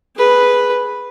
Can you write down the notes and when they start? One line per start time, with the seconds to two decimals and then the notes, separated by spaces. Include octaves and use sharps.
0.16 G#4 B4